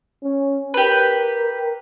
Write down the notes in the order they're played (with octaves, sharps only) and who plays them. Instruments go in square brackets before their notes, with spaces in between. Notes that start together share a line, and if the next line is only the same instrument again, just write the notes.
[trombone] C#4
[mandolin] G4 B4 [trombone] A#4